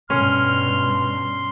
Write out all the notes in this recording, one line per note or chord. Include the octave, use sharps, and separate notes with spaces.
G2 B2 C#4 C6 F6